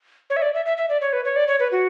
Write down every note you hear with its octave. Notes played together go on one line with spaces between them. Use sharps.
C#5
E5
D5
E5
E5
E5
D5
C#5
B4
C#5
D5
C#5
B4
F#4